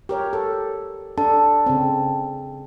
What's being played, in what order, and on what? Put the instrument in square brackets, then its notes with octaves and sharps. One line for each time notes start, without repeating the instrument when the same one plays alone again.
[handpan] G4 A#4 C#5
A4
[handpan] D4 A4 [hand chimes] A5
[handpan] C#3 C4